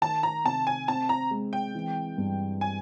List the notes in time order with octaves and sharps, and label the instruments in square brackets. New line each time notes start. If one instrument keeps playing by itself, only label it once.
[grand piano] D#3 [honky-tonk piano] A5
[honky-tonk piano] A#5
[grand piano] C3 [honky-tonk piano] A5
[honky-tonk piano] G#5
[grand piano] C4 [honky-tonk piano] A5
[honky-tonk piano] A#5
[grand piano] G#3
[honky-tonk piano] G5
[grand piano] E3
G2
[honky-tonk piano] G#5